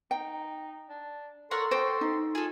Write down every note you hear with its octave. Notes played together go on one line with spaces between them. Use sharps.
D#4 G5
D4
A4 A#4 C#5 F#5 C6
F#4 C5 G5 D#6
D#4
F4 G#4 A4 G#5